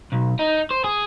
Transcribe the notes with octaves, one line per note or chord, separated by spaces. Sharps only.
B1
D#4
C5
G#4